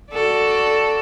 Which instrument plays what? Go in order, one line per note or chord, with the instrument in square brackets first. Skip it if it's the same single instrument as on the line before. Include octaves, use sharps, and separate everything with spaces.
[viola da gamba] F#4 A4 D5